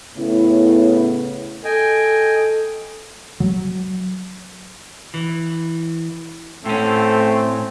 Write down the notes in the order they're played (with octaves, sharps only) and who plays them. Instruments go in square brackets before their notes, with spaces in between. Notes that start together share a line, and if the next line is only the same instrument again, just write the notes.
[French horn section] A2 C#3 B3 E4
[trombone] A4 [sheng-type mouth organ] D#5 G5 G#5
[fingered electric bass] F#3
[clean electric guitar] E3
[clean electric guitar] A2 C#4 [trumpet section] A3 C4